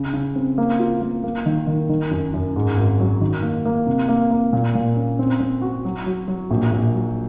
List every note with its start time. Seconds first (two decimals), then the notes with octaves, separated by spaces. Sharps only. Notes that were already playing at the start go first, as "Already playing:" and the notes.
Already playing: C#3
0.14 C#3
0.36 C4
0.58 A#3
0.79 F4
1.02 A#3
1.24 A#3
1.46 D#3
1.67 D#3
1.89 D#3
2.11 F#2
2.34 F#2
2.56 G#2
2.77 G#1
3.00 F#3
3.21 D#3
3.42 A#3
3.65 A#3
3.86 C3
4.08 A#3
4.31 A#3
4.53 A#2
4.75 A#2
4.96 C#4
5.19 C4
5.40 C4
5.62 F#4
5.85 F#3
6.06 F#3
6.28 F#3
6.51 A#1
6.71 A#1
6.94 F#3